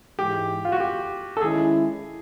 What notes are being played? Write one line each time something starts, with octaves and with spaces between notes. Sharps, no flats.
G#2 E3 G#3 G4
F4
F#4
G4
A4
D#3 G#3 C#4 E4 G#4